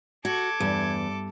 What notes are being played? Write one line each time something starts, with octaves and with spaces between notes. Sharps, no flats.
F#4 A4 D6 G#6
E2 G2